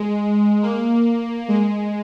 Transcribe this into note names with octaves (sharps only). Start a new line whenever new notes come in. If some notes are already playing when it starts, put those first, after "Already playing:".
Already playing: G#3
A#3
G#3